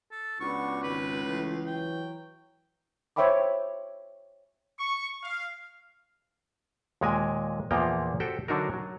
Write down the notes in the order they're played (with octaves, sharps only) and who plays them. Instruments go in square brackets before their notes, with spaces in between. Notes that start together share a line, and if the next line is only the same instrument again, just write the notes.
[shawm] A4
[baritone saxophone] C#2 [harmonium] B3 D4 F#4 [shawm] C#6
[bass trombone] G#1 [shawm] B4
[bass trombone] E3 [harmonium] A3
[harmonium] F#3 [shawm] G5
[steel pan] C5 C#5 E5 G5 B5 D6
[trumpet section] C#6
F5
[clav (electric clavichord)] D#2 A#2 G#3 A#4 G#5
E2 A#2 F3 A#3 G5 A#5
F#4 G4 A4 C5 G5
D3 F#3 D4 D#4 F#4 A#4
F#3